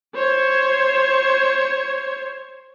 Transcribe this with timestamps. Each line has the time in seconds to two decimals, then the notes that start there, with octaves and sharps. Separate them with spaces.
0.15 C5 C#5 G#6